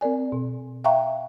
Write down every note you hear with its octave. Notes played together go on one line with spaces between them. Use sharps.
C4 A#4 D5 G#5
B2
E5 F5 G5 A#5 C#6